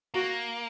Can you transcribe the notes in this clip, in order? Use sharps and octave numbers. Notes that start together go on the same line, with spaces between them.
A#3 F#4